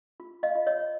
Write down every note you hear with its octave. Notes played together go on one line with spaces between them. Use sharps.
F4
D#5 F5
F4
C#5 D#5